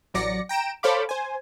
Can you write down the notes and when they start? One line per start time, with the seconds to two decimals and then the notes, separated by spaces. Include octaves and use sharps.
0.14 A1 F#3 D5 A#6 C#7
0.49 G5 A#5 D7 E7
0.83 A4 C5 C#5 F5 B5 D6
1.09 C5 G#5